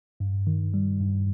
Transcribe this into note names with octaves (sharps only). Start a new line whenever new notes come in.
G2
D#3
G3
G2